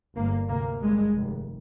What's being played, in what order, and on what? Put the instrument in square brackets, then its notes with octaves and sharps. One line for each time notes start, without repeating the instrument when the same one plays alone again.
[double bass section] G1 G2 A#3
D2 C3 A#3
G#1 G2 G#3
F1 D#2